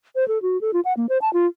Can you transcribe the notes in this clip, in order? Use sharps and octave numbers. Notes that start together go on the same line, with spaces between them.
C5
A4
F#4
A4
F4
F#5
A#3
C5
A5
F4